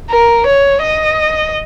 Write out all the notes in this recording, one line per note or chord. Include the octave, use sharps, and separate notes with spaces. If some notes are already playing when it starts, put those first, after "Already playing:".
A#4
C#5
D#5